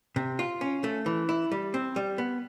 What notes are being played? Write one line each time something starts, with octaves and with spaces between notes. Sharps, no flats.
C3
F4
C#4
A3
E3
E4
G3
C4
G3
B3